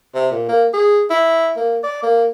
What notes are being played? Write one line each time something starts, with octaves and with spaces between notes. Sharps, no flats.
C3
A#2
A#3
G#4
E4
A#3
D5
A#3